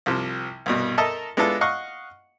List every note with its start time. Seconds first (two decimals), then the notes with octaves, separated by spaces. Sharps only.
0.06 C2 C3 F3
0.66 C2 G2 B2
0.98 A4 A#4 D#5 E5 A5 A#5
1.37 G#3 B3 D4 E4 F4 A4
1.61 D#5 F5 F#5 C#6